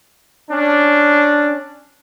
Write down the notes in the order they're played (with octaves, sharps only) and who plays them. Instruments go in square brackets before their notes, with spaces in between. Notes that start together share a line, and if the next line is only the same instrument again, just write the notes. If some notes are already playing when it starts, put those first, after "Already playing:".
[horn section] C#4 D4